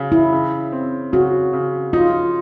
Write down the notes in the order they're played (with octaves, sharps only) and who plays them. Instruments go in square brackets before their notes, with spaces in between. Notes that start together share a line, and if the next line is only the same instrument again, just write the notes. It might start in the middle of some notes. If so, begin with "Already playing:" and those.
Already playing: [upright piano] C#3 F#3
[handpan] E4
[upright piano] C#3
C4
[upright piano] C#3 [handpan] F#4
[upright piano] C#3
[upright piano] D#4 [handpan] F4